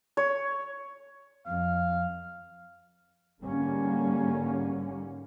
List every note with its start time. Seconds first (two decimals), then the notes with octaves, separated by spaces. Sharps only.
0.17 C#5
1.47 F2 F5
3.42 G#2 D3 G3 A#3 C#4